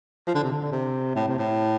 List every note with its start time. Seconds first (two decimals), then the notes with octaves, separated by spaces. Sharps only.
0.27 F3
0.35 D3
0.44 C3
0.52 D3
0.62 D3
0.72 C3
1.15 A2
1.28 C3
1.39 A2